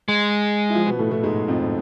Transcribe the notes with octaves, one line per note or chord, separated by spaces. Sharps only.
G#3
E4
F3 F4
B2 B3
A2 A3
A2 A3
G#2 G#3
F2 F3